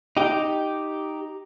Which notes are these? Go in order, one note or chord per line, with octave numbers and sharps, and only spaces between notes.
D#4 G4